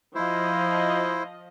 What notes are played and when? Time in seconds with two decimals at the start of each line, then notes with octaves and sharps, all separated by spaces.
0.15 F3 E4 C5 D#5